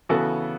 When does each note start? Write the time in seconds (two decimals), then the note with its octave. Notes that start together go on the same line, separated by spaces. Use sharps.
0.09 C#3 E3 B3 F#4 A4